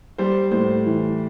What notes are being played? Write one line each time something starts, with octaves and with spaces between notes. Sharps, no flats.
G3 C5
A2 C5
E3